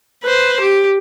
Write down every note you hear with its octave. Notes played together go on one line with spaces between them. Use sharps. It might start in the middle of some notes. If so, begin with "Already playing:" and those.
B4 C5
G4